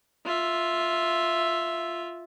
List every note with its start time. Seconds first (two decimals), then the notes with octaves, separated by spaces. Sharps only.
0.25 F4 E5